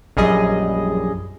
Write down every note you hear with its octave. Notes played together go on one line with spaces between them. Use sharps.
A#1 F#2 G3 G#4 D#5